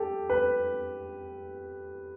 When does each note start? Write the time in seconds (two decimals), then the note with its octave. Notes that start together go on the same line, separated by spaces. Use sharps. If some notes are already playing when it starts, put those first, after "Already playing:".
Already playing: G4 A4
0.30 B4